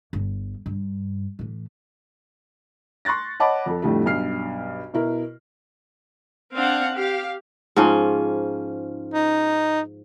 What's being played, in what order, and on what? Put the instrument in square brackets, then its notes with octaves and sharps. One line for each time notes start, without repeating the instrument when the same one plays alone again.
[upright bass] G1
G2
A2 E3
[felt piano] C6 C#6 F#6 A6 A#6
C#5 D#5 F#5 A5 B5 D6
F2 A4
F2 A2 D3 G3 A3
B1 G2 F6 C7
B2 E4 A#4
[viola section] C4 D4 F5 F#5
G4 F5
[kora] G#2 F3 C#4
[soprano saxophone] D#4